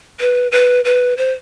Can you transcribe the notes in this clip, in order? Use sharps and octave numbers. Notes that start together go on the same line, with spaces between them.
B4
B4
B4
C5